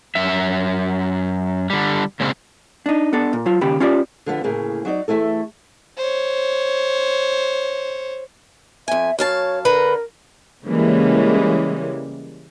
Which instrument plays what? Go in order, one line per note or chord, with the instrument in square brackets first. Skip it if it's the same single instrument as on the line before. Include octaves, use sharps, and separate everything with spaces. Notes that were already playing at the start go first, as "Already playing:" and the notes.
[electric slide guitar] F#2 E5
D3 G3
A#2 C#3 G#3 C4 C#4
[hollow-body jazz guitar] D4 D#4
B3 D4 A4
A#2
F#3 F4
D#2 C#3 G4 B5
C#4 F4 G4 D5
[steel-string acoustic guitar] D3 F3 B3
D2 A2 C#3 A#3 G#4
F#3 D#4 D5
E2 A#2 A3 E4 A4
[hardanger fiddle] C5 C#5
[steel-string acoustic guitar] F2 G#5 [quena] E5
[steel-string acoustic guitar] F#2 F5 A5 [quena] C#5
[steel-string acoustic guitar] D3 B4 A#5 [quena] A#4
[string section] C#3 E3 G3 G#3 A#3 C#4